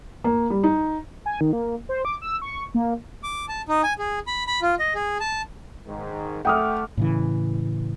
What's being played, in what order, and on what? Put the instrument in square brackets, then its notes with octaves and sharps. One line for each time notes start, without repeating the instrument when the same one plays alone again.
[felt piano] A#3
G3
D#4
[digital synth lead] G#5
D#3
A#3
C5
D6
E6
C#6
A#3
[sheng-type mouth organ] D6
A5
D#4
G#5
G#4
B5
B5
F4
D#5
G#4
A5
[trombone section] G#2 D#3
[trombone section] A3 [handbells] F#5 D6 [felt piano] G5 D#6 F6
[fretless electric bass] A2 C#3 E3